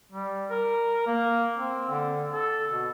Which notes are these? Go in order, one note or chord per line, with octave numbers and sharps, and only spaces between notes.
G3
A#4
A#3
C4
D3
A4
B2